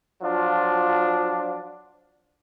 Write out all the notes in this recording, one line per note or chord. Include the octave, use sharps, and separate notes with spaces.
F3 F#3 D4 F4